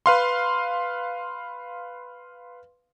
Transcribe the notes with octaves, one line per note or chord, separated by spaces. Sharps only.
B4 F5 C6